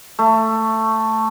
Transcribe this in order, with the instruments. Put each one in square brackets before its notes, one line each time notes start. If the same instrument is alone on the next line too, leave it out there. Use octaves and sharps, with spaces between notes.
[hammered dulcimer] A3